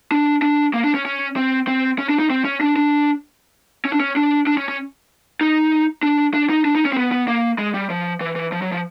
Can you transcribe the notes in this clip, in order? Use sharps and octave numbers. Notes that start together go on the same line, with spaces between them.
D4
D4
A#3
D4
C#4
C#4
C4
C4
C#4
D4
D#4
C4
C#4
D4
D4
C#4
D4
C#4
D4
D4
C#4
C#4
D#4
D4
D4
D#4
D4
D#4
C#4
C4
B3
B3
A#3
G#3
G3
F3
E3
E3
F3
F#3
F3